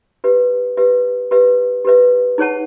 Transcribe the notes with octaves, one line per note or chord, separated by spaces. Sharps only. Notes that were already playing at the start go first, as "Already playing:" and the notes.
G4 B4 E5
G4 B4 E5
G4 B4 E5
G4 B4 E5
D#4 G#4 C#5 F#5 A5